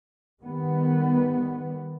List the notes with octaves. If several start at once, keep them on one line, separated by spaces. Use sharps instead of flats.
D#3 G3 B3